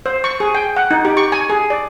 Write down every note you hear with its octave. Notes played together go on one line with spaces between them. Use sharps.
C5
C#6
G#4
G5
F#5
D#4
G4
C#6
G#5
G#4
D5